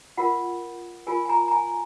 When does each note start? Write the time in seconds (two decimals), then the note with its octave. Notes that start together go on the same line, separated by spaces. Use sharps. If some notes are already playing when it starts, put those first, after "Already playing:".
0.17 F4 A#4 F#5
1.07 F4 A#4 G#5
1.25 G#5
1.29 A#5
1.48 A#5
1.52 G#5